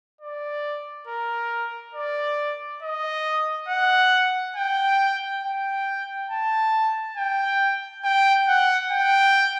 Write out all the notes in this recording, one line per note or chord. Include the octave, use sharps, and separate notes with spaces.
D5
A#4
D5
D#5
F#5
G5
G5
A5
G5
G5
F#5
G5